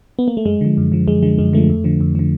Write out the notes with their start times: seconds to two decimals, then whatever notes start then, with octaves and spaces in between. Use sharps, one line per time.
0.19 B3
0.28 A#3
0.37 A3
0.46 F#2 G#3
0.61 D3 F3
0.77 F#2
0.92 D3 F3
1.07 F#2 G#3
1.23 D3 F3 G#3
1.38 F#2 G#3
1.53 D3 F3 A3
1.70 F2
1.84 D3 F3
2.01 F2
2.15 D3 F3